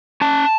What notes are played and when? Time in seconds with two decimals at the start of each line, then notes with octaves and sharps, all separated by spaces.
0.21 C#4 A5